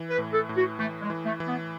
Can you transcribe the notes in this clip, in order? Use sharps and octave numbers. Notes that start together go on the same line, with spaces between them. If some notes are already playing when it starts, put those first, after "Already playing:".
Already playing: E3
B4
A2
A4
A2
F#4
E3 A3
G#3
E3
A3
E3
B3